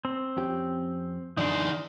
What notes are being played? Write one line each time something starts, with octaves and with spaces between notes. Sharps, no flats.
C4
F2 C#4 G4
F#2 D3 E3 D4 D#4 D5 C6